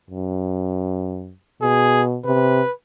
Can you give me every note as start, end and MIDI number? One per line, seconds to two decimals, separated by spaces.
0.10 1.33 42
1.62 2.18 47
1.62 2.03 68
2.25 2.61 48
2.25 2.72 71